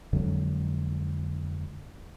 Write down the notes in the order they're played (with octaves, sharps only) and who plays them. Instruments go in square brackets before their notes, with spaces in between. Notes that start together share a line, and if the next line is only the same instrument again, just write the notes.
[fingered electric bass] F2 D3 F#3 G#3